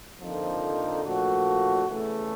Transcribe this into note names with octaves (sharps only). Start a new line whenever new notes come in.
F2 D3 F3 A#3 D#4
A#2 F3 A3 D4 F#4
E2 C#3 E3 A3